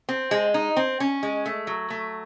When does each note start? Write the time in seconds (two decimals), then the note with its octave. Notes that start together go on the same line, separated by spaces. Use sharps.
0.09 C4
0.31 G#3
0.54 D#4
0.76 C4
1.00 C#4
1.23 G#3
1.46 A3
1.67 F#3
1.90 A3